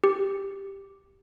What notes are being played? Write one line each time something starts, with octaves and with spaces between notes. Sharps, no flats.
G4